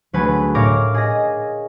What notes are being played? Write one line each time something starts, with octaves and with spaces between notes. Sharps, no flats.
D2 F#3 A3 G#4 A4 B4
A2 A#4 C#5 F5 D6 A#6
G#4 D#5 A#6